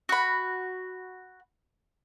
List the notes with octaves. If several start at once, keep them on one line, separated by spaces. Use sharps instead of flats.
F#4 B5